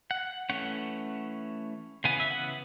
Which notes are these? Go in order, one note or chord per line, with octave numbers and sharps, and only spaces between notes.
F#5
E3 A3 C#4 F#5
C#3 E3 B3 G#5
E5
F#5